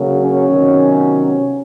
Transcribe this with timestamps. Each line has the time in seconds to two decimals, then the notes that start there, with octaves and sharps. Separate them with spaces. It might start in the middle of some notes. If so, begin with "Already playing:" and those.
Already playing: C#3 F#3 A#3
0.20 C#4
0.49 C3 D#3 F#3 B3